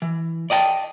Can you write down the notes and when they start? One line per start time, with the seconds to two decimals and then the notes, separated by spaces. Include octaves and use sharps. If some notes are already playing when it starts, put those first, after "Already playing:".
0.02 E3
0.50 D5 D#5 G5 A5